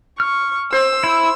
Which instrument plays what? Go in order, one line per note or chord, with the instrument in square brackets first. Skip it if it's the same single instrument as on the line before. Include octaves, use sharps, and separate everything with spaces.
[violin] C#6 [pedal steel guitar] F6
[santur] C5 [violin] E6
[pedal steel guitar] E4